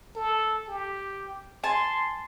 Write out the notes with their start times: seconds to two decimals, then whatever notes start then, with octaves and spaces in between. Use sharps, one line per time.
0.16 A4
0.68 G4
1.64 G#5 A5 C6